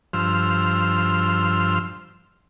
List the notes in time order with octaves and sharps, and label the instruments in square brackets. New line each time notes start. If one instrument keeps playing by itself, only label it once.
[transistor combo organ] G2 F3 C5 E6 F6